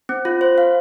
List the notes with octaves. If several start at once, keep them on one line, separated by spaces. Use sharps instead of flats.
C4
F4
C5
F5